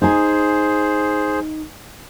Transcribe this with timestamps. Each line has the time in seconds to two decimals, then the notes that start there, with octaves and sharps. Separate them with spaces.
0.02 D#4 G#4 C5 G#5